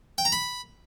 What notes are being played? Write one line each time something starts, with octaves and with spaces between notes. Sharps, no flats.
G5
A#5
B5